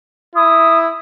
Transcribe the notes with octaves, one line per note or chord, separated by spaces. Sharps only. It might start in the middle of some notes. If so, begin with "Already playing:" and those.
E4 D#6